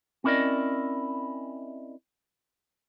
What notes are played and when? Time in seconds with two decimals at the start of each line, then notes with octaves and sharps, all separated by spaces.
0.24 C4 C#4 E4 A#4 D5 D#5